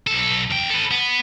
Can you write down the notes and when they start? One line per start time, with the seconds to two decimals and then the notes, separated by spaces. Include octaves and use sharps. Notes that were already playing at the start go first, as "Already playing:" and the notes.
0.07 B1 A4
0.50 E2 G5
0.70 A4 B4
0.91 B3